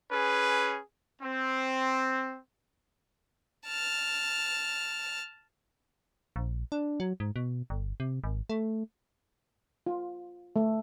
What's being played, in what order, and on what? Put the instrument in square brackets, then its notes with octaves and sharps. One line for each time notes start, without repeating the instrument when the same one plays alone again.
[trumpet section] C#4 G#4 B4
C4
[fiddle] A5 F6
[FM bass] A#1
D4
F#3
G#2
B2
G1
C3
G#1
A3
[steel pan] F4
A3